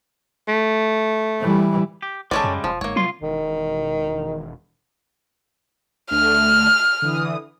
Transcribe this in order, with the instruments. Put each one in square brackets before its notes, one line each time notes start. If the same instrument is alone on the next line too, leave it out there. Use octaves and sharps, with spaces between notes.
[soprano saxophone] A3
[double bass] E3 G3
[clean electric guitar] G4
[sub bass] G#1 [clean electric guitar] C#3 G3 G#3 [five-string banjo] A4 C#5 D5
[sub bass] F#2
[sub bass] E1 [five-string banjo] F3
[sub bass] G1 [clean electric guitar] G#2 [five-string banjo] A#3 C#5
[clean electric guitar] C2 F4 C6 [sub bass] F#3
[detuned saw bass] E1 [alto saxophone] D#3
[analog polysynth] D2 D3 A3 [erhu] F6
[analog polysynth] D3 E3 D#6